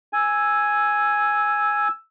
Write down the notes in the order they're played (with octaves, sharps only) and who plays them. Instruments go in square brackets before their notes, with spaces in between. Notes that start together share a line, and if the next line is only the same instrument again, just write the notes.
[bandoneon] G#5 [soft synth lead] E6